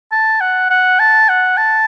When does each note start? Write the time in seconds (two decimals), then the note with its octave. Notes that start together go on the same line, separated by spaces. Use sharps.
0.12 A5
0.41 F#5
0.70 F#5
0.99 A5
1.29 F#5
1.57 A5